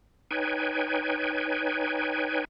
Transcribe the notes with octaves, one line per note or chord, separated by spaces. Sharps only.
D#4 B4 C#5 G5 G#5